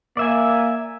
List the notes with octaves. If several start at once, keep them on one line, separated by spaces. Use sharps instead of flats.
A#3 D5 E5 G#5